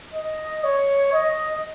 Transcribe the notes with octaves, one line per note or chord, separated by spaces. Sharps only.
D#5
C#5
D#5